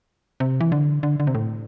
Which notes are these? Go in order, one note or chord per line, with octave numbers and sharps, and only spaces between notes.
C3
E3
D3
D3
D3
C3
A2